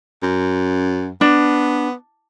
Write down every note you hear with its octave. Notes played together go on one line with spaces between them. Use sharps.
F#2
B3 D4